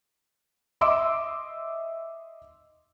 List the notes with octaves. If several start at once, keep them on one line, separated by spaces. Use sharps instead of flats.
D#5 E5 C6 D6 E6 D7